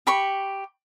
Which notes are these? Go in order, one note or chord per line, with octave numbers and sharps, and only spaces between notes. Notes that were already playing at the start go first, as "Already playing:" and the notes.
G4 B5 C#6